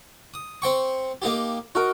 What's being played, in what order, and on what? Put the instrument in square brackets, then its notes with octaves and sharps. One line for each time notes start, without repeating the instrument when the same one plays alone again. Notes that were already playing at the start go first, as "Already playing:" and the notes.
[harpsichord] D#6
C4 G5 C#6
A#3 D#4 G4
[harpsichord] D#4 [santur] F#4 A#4